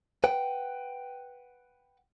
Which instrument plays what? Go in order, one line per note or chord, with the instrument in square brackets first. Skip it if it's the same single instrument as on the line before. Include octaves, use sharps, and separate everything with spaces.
[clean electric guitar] B4 F#5 G5